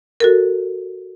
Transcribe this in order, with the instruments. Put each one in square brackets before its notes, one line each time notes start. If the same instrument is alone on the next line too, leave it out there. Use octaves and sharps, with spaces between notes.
[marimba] F#4 A4 A#4